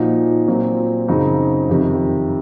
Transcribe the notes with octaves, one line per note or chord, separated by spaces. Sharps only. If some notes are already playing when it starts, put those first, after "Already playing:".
Already playing: A#2 F3 A#3 D#4 F#4
A#2 F#3 C4
F#2 C#3 F#3 C4 D#4
F2 C3 D#3